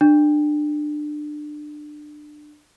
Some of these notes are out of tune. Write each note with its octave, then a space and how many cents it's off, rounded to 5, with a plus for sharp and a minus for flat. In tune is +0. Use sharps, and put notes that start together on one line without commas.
D4 +25